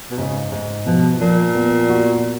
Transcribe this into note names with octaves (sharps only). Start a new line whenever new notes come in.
B2
G#2 C#3
G#2
B2 F3
A#2 F3
B3
F#4